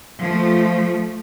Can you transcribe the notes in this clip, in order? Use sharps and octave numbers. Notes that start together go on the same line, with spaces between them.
F3 A3